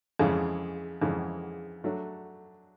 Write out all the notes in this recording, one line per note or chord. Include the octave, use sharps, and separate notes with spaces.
F2 C#3 E3 G#3
F2 C#3 E3 G#3
F#3 A3 D4